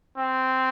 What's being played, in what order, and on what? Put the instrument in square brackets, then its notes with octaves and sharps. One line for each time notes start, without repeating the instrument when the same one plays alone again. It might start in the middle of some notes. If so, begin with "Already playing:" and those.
[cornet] C4